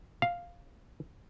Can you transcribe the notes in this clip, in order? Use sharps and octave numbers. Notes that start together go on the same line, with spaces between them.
F5